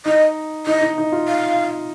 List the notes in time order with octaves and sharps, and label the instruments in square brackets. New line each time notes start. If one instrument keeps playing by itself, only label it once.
[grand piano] D#4 [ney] D#5
[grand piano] D#4 [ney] D#5
[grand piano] D#4
D#4
F4
[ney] F5